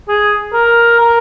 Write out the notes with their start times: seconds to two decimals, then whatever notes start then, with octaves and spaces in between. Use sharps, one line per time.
0.08 G#4
0.53 A#4
1.00 A#4